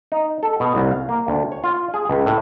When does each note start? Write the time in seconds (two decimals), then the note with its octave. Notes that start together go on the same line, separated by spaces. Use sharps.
0.12 D#4
0.43 A4
0.60 B2
0.75 C2
0.91 F5
1.09 A#3
1.28 D2
1.52 C#5
1.64 F4
1.94 G#4
2.09 C#2
2.26 A2